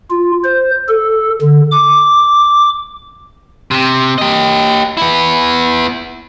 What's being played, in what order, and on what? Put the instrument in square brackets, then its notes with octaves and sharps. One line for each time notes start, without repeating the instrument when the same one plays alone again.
[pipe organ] F4
C5
A4
D3
D6
[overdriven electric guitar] C3
G4 D#5
B3 E4